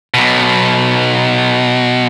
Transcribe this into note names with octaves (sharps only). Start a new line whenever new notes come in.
B1 B2